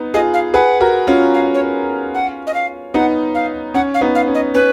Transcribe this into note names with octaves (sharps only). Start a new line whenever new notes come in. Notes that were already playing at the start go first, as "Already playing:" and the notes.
Already playing: B3 D#4
F4 G#4 D#5
F5
G#4 B4 F#5
F#4 A#4
C#4 F4
F5
C#5
F#5
D#5
F5
B3 D#4 F#5
F5
C#4 F#5
F5
B3 D#4
F5
C#4
D#5
C#4 B4